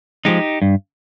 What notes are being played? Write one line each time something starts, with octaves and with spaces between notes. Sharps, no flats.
F3 G#3 D#4 G4
G2